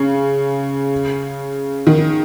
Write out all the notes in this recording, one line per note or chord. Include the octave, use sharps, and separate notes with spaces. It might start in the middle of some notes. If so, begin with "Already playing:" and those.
Already playing: C#3
D#3